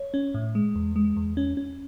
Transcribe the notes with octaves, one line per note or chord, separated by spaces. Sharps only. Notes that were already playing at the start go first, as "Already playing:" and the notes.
Already playing: C#5
C#4
A2
G#3
E2
G#3
E2
C#4
C#4